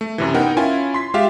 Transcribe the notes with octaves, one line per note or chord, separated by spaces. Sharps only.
A3
F#2 C3 E3
B3 D#4 A#4 F#5 G5
C#4 E4 F4 G#5
C6 B6
G#3 F4 G4 E5 F5